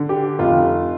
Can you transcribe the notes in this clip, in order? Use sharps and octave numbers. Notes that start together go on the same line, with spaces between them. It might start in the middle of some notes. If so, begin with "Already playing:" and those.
Already playing: D3
G4
F1 F4